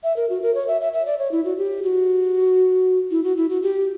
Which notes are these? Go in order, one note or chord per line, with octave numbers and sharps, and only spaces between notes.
E5
A#4
F#4
A#4
C#5
E5
E5
E5
D5
C#5
E4
F#4
G4
F#4
E4
F#4
E4
F#4
G4